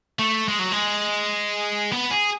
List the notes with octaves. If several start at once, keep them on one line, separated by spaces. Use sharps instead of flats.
A3
G#3
F#3
G#3
B3
G#4